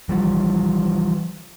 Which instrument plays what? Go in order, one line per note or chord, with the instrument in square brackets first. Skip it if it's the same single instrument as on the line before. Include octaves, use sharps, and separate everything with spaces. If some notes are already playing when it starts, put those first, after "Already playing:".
[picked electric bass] E3 F3 G3